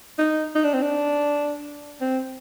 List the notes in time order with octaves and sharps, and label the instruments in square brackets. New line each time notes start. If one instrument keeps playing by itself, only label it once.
[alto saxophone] D#4
D#4
D4
C4
D4
C4